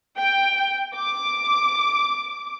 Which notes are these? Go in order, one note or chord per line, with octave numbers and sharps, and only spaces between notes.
G5
D6